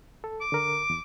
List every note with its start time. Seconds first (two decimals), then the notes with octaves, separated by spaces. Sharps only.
0.24 A4
0.41 D6
0.52 D3 A#4
0.90 E2